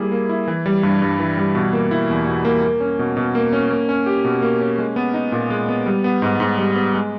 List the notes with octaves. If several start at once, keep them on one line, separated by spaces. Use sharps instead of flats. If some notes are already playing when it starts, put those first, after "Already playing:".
Already playing: G3 A#3 E4 G#4
A#3
E4
E3
G3
G2
G2
E3
G3
B2
A#3
E4
E2
B2
A#3
A#3
C#4
B2
B2
A#3
C#4
A#3
C#4
G4
B2
A#3
C#4
G#3
B3
D#4
A#2
G#3
B3
G3
B3
G#2
G#2
G3
B3
G#3